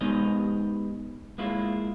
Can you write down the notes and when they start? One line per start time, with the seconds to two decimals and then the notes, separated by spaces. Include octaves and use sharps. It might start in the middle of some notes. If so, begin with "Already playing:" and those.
0.01 G#3 B3 D#4 G4 A#4 D#5
1.38 G#3 A#3 E4 F4